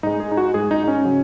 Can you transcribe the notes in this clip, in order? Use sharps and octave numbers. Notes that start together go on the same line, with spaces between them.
G#2 G#3 D#4
G#4
D#4
F#4
G#2 G#3 G#4
D#4
D#4
C#4
C#3 F#3